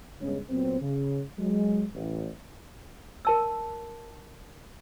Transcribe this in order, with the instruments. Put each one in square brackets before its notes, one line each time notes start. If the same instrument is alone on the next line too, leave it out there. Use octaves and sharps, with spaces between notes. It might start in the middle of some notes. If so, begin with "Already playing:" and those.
[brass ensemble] G2 C#3 G#3 B3 C#4
A#2 F#3 B3 C4
C#3
F#3 G#3
A1
[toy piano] A#4 A5 E6